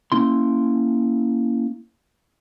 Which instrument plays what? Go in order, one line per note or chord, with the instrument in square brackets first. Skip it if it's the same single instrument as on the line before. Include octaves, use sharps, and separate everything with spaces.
[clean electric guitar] A#3 C#4 E4 C6